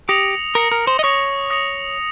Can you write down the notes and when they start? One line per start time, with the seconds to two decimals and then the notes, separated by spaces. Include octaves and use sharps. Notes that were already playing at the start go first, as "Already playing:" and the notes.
0.09 G4 D#6 A#6 C#7 F7
0.55 A#4 D#6 A#6 C#7 F7
0.72 A#4
0.87 C5
0.99 D#5
1.03 C#5 D#6 A#6 C#7 F7
1.50 D#6 A#6 C#7 F7